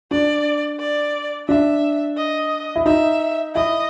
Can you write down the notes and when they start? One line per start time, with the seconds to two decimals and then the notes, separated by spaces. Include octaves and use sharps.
0.11 D4 D5
0.80 D5
1.49 D4 E5
2.17 D#5
2.76 E4
2.86 D#4 E5
3.55 E4 D#5